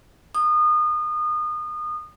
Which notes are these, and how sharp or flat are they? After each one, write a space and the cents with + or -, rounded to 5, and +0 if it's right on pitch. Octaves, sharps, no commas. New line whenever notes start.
D#6 -30